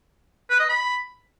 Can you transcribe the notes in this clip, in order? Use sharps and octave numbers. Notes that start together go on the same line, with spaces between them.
B4
D#5
B5